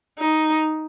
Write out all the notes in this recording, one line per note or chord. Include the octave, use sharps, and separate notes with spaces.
D#4